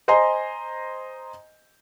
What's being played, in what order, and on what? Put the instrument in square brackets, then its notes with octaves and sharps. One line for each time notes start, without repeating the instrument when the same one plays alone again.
[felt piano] C5 D#5 G#5 A#5 C6